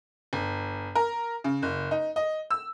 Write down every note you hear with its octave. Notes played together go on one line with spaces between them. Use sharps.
G1
A#4
C#3
F#1
D#4
D#5
E6